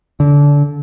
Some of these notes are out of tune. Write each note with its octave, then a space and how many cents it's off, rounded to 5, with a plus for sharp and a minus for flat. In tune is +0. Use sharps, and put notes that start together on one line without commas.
D3 -25